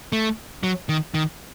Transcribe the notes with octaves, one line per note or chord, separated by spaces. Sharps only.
A3
F#3
D#3
D#3